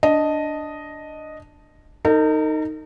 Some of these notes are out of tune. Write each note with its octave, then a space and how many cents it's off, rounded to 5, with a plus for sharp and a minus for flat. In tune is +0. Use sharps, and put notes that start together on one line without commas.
D4 +0 D#5 +0
D#4 +0 A#4 -45